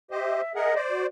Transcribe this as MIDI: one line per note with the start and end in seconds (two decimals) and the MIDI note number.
0.11 0.41 67
0.11 0.41 72
0.11 0.41 75
0.11 0.52 76
0.55 0.74 68
0.55 0.74 70
0.55 0.77 75
0.55 0.77 76
0.55 0.74 78
0.75 1.07 72
0.75 1.07 74
0.90 1.03 66